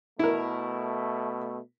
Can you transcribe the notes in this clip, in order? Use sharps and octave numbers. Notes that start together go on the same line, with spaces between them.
B2 A3 E4 A#4